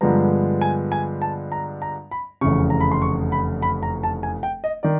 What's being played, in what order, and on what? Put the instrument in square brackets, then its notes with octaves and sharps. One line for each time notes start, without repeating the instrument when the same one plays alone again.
[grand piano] G2 D3 F3 G#3 B3 A#5
G#5
G#5
A5
A#5
A#5
B5
F1 E2 C#3 C#6
A#5
B5
C6
C#6
B5
B5
A#5
A5
G#5
G5
D#5
D#3 D5